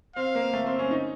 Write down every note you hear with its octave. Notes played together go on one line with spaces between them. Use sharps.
C4 F5
A#3
A3
C4
C#4
D#4